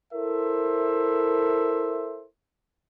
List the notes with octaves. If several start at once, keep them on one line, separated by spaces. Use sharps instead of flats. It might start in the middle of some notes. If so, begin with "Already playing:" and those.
E4 A4 A#4 C5 E5